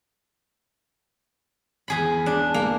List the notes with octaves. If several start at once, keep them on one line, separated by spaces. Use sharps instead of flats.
E2 G#4 B5
D4
A#3